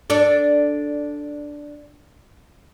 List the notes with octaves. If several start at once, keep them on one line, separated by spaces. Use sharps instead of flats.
D4 A4 D5